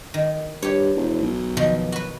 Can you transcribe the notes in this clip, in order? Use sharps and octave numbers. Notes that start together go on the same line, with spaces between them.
D#3
G2 G4 C#5
E1
B1
B2 D#3 F3
F#4 B4